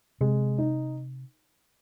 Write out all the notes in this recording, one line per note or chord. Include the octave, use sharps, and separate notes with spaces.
C3 G#3
D#4